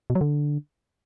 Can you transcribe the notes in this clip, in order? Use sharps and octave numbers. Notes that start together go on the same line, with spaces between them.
B2
F#3
D3